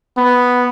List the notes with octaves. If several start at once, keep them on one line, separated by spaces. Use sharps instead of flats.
B3